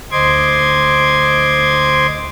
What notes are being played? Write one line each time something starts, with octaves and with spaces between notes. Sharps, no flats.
D2 C5 D#5 C6 D6 G#6